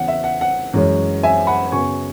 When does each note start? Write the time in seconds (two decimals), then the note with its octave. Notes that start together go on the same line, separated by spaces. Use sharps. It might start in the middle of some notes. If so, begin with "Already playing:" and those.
Already playing: E2 C#3 E3 F#5
0.08 E5
0.24 F#5
0.41 F#5
0.73 F#2 E3 G#3 C#4
1.23 E5 G#5
1.47 F#5 B5
1.72 F#2 C#3 F#3 B3 G#5 C#6